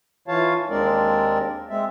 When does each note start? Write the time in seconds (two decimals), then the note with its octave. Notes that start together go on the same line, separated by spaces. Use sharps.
0.28 E3 F4 C#5 F5 A5
0.70 D#2 G#3 C4 D4 A#4 D5
1.70 G#3 C4 E5